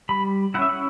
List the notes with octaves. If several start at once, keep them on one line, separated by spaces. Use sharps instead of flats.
G3 B5
C#4 E4 E5 F#5
F#5